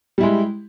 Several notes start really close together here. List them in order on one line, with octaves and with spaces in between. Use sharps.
G3 E4 G#3